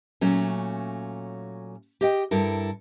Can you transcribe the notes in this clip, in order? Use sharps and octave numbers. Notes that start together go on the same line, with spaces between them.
A#2 F#3 A3 C#4
G4 D#5 G5
G2 E4 A4 A#4